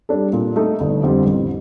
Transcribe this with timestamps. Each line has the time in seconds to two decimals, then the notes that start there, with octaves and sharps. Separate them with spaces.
0.09 G3 D4 A4
0.33 A#2
0.56 A3 D#4 A4
0.80 G1
1.04 F2 D3 G3 C4
1.26 A1